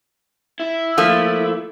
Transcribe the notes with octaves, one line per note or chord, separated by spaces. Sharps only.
E4
F3 A3 A#3